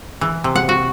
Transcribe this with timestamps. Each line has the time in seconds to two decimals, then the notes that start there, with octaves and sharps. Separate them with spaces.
0.21 E3
0.44 C3
0.56 F#5
0.69 F#4